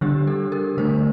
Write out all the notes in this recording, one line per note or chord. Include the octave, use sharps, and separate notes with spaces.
D3 G3 D4 G4
A4
A#4
D3 A3 D4 C5